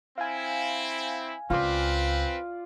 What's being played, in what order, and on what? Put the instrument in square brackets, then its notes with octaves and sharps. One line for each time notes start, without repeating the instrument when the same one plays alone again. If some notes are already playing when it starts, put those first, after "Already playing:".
[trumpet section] C4 E4 [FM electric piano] F5 G#5
[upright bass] C#2 [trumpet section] C4 B4 [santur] F4 D5